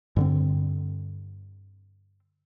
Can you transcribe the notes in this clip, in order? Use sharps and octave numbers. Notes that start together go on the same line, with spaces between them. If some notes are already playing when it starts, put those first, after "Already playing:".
G2 D3 C4